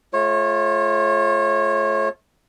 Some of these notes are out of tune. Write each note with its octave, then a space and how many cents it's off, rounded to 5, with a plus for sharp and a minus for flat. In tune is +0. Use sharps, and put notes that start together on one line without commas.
A3 -30 F4 +0 C#5 -30